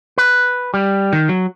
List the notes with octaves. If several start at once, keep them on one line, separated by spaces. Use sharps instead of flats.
B4
G3
D#3
F#3